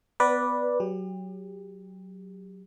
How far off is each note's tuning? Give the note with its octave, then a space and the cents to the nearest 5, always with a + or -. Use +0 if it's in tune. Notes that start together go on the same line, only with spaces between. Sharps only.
B3 +20 B4 -10 D5 +0
F#3 +15 G4 +30